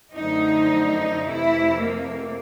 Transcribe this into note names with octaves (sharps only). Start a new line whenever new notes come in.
F#2 D3 F3 A3 D#4
F2 C3 E3 A3 E4
A#3